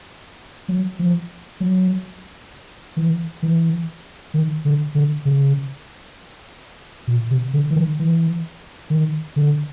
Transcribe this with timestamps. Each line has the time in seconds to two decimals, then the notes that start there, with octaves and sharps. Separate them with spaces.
0.68 F#3
0.99 F3
1.60 F#3
2.97 E3
3.42 E3
4.34 D#3
4.65 D3
4.95 D3
5.25 C#3
7.08 A#2
7.31 C3
7.53 D3
7.70 E3
7.76 D#3
7.99 E3
8.90 D#3
9.36 D3